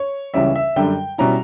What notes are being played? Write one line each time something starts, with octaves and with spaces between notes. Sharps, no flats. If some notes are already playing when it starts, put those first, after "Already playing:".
Already playing: C#5
C#2 C#3 E3 G3 C#4 E5
E5
F#2 D3 G3 G5
B2 G3 C#4 E4 A#5